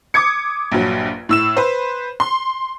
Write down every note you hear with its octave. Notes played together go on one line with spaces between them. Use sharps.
D6 D#6 G#6 C#7
A#1 G2 F#3
A2 E6 E7
B4 C5
C6